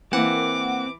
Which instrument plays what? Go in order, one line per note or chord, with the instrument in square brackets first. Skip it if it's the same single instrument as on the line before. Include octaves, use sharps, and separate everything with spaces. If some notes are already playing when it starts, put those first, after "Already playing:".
[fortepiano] E3 [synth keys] A#3 F#5 [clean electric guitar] C4 [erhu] D6